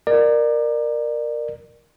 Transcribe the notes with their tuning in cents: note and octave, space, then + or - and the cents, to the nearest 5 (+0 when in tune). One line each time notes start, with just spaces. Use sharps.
A#4 +0 D5 +25